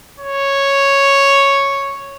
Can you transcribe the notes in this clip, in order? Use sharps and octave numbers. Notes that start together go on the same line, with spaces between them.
C#5